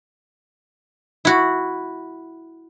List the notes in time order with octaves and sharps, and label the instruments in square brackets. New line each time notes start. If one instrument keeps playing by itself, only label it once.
[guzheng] E4 F#4